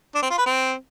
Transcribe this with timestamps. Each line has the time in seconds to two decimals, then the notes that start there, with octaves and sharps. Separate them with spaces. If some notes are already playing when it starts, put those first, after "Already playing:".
0.15 D4
0.23 C4
0.30 F4
0.38 B4
0.46 C4